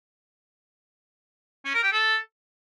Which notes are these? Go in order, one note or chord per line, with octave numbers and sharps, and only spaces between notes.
C#4
A#4
G4
A4